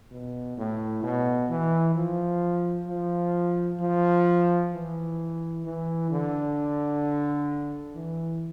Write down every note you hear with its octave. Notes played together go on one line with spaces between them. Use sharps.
B2
A2
B2
E3
F3
F3
F3
E3
E3
D3
E3